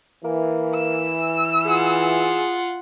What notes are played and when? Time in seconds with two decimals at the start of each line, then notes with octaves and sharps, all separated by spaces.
0.25 E3 A#3
0.75 E6
1.66 F4 G#4 F#5